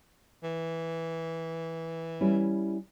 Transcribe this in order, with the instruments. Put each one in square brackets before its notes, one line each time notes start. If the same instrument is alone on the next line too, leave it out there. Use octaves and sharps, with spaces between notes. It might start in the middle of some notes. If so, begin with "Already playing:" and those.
[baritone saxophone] E3
[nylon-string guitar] G3 C#4 E4